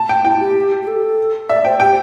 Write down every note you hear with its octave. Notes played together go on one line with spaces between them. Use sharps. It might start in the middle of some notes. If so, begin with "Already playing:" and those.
Already playing: A5
G5
E4 G5
G4
G4
A4
D5 E5
C5 G5
G4 G5